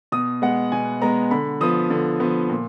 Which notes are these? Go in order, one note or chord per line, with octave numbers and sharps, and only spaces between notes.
B2 D#6
G#3 B3 F#5
B2 G#5
G#3 B3 A#5
D3 B5
F3 B3 D#6
D3
F3 B3
A#2